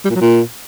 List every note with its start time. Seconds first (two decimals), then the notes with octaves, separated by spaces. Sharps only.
0.05 G3
0.10 A#2
0.16 F#3
0.21 A#2